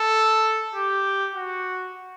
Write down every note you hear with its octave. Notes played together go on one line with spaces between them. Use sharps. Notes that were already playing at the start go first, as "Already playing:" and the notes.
Already playing: A4
G4
F#4